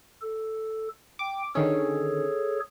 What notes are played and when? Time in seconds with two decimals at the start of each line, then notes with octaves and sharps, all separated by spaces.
0.22 A4
1.19 G5 D6
1.55 D3 D#3 C#4 G#4 A4 C#5